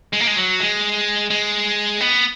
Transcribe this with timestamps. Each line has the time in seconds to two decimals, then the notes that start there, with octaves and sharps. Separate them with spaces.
0.13 G#3
0.20 A#3
0.27 G#3
0.37 F#3
0.60 G#3
1.30 G#3
2.01 B3